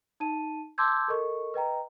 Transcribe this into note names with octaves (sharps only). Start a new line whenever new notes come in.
D#4 A5 D#7
A5 C6 D6 E6 G6 G#6
A4 A#4 D#5 C#6
B4 D#5 G5 A#5